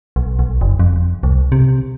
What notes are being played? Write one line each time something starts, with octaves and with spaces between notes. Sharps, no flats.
B1
B1
F#1
F2
C2
C3